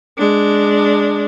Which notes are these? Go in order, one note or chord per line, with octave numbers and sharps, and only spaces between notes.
G#3 D4